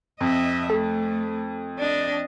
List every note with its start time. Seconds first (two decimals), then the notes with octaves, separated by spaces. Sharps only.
0.21 F2 D#5 E5
0.70 A3 A4
1.79 D4 D#5